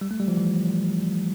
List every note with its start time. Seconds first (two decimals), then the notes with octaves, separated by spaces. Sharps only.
0.01 G3
0.11 A3
0.20 G3
0.28 F3
0.37 E3